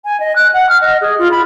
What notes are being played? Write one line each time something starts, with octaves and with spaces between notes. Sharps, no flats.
G#5
D#5
F#6
F#5
F6
D#5
G#4
F4
B5